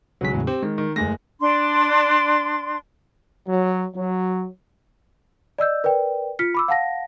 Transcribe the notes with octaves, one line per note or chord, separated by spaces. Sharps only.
B1 C#3 F#3 G#3 B6
E2 A2 C#3
C4 G4
D#3 G#3
D#3
F#1 G#3 A3 A#6
D4 C6
F#3
F#3
D5 D#5 E6 G6
A#4 B4 D5 G5
F4 F6 B6 C#7
B5 D6 E6
F5 F#5 A5 A#6